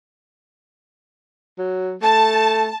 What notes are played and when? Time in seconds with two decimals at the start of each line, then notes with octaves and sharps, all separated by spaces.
1.58 F#3
2.02 A3 A5